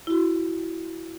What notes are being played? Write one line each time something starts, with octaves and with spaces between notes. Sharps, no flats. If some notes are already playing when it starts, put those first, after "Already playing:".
E4 F#4